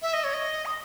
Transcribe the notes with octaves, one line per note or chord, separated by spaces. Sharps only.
E5
D#5
C#5
D#5
D#6